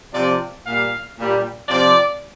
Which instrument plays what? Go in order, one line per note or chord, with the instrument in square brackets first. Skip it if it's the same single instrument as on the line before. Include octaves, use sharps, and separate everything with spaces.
[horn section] C3 F3 D5
A#2 G3 F5
A#2 G3
C3 F3 D5